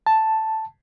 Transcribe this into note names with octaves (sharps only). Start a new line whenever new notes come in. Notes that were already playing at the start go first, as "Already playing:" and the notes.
A5